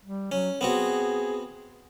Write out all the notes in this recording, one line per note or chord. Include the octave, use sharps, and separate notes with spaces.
G3
F#3 C#4
B3 C4 F#4 G#4